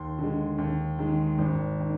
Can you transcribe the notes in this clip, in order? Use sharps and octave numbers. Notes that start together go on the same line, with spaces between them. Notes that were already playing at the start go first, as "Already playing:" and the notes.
Already playing: D#2 C6
D3 G#3
D#2
D#3 G#3
G#1
D#3